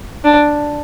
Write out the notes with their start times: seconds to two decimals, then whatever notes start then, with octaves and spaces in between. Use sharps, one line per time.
0.24 D4